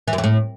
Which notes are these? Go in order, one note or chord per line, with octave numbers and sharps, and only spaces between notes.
E3
F#2
F2
A2